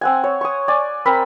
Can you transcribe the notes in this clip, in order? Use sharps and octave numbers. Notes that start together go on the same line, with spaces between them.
C4 F#5 G#5
C#5
C#6 D#6
D5 G#5
C4 A#4 B5